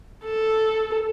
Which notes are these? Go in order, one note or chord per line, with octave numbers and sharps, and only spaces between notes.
A4